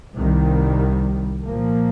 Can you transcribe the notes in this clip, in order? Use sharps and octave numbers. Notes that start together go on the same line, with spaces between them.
C2 C3 D#3 G3
A#2 F3 A#3